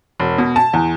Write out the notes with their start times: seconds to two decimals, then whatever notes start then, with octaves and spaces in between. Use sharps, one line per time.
0.20 E1
0.38 B2
0.56 A5
0.73 E2